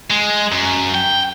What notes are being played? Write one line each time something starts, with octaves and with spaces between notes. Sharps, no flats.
G#3
F#2
G5